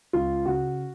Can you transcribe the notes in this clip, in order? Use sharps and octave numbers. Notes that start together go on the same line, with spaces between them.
C#2 F4
C#3 F#4